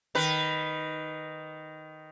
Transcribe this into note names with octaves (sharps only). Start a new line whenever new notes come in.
D#3 B4